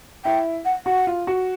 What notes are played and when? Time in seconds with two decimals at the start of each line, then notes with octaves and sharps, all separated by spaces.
0.24 E4 G5
0.65 F#5
0.86 F#4 F#5
1.07 F4
1.27 F#4